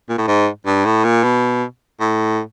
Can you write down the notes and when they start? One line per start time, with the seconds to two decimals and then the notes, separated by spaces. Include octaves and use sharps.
0.09 A#2
0.18 A2
0.28 G#2
0.66 G2
0.85 A2
1.04 A#2
1.24 B2
2.01 A2